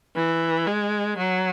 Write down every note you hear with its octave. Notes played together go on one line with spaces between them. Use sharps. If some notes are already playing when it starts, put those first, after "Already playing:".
E3
G#3
F#3